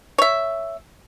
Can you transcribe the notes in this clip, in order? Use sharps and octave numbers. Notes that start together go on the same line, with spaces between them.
C#5 E5